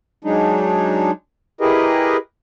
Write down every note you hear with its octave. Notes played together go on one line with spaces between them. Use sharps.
F#3 G#3 D4 D#4
E4 G4 G#4 A#4 B4 D#5